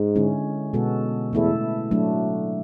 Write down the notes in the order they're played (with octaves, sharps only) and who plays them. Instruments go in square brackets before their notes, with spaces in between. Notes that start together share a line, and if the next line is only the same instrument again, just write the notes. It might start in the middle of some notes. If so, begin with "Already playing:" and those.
Already playing: [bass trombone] G#2
[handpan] D3 G#3 C#4 E4
B2 G#3 B3 F#4 A4
[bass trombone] E2 [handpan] A3 E4 A4
[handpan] F#3 A3 D4